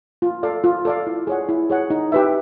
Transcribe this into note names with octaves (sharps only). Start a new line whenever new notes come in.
F4
A4 D5 F5
F4
A4 D5 F5
E4
G#4 C#5 F#5
E4
G#4 C#5 F#5
D#4
G4 B4 E5